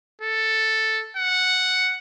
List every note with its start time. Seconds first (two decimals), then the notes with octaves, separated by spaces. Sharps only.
0.21 A4
1.17 F#5